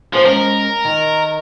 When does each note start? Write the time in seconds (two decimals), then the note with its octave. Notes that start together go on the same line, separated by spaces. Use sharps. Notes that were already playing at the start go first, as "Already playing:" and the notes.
0.13 F3 G#4 C5
0.26 G#3 C#4 A#4
0.85 D#3